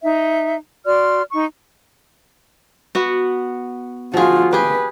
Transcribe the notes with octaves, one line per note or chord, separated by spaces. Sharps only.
D#4 E5
F#4 D5 C6 F6
D#4 C#6
B3 F#4
F3 F4 F#4 G#4
G4 G#4 B4